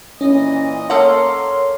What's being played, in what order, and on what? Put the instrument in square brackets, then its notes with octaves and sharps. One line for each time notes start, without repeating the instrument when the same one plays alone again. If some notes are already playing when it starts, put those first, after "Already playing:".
[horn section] A#2 E3 D#5 [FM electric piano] C#4
[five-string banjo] A#3 A4 F#5 [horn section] A#4 C6 [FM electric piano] C#5